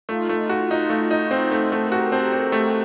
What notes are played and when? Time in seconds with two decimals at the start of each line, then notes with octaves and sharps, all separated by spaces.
0.09 A3 D#4 F4
0.29 A3
0.49 F#4
0.71 D#4
0.90 A3
1.11 D#4
1.31 C4
1.51 A3
1.72 A3 A4
1.84 A#4
1.92 F#4 G4 A4
2.12 C4
2.32 C4
2.52 A3